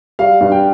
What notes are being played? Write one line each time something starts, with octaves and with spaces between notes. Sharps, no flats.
G3 F5
G2
G5